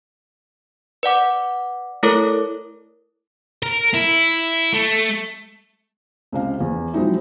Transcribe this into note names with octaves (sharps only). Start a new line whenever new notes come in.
B4 D5 F#5 D6
A3 E4 A4 A#4 C#5 D6
A#4
E4
A3
C#2 C3 F5
E2
F3 F#3 G#3 C4 D#4 E4